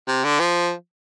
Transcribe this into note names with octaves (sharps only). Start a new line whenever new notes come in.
C3
D3
F3